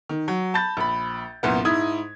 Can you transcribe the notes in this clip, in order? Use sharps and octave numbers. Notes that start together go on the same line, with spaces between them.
D#3
F#3
A5 B5 G6 A6
A#1 B5
C2 F#2 A#2 B3
G#2 E4 D#6 G#6